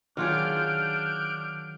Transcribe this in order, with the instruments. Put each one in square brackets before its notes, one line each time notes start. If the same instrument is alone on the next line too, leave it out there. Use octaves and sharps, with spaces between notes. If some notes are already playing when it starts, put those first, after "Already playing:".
[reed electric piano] D#3 [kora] F#3 F4 G#4 [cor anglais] D4 [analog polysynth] F6 G6 D7